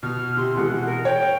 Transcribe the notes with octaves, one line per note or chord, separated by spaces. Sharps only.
B2 F6
C3 C6
B2 E3 G#3 F#5
A#4
C#5 G5